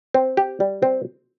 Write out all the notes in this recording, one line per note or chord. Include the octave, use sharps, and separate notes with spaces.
C4
G4
G3
C4